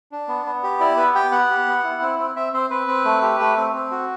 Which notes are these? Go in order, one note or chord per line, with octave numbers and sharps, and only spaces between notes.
D4
B3
B3
G4
E4 D5
B3 B4
G4 G5
B3 F#5
G4
B3
E4
C4
C4
C4 E5
C4 C5
C4 B4
C4
A3
G4
A3
C4
C4
F#4